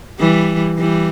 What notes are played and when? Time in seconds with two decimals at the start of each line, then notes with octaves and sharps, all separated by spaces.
0.20 E3 G3
0.78 E3 G3